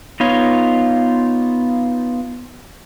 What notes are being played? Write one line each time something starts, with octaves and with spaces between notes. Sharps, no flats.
B3 D#4 F4 C#5